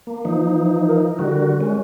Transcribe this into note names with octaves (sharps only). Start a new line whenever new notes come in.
A#3
E3 F3 D#4
A#4
D3 G3 F#4
G#3 C#4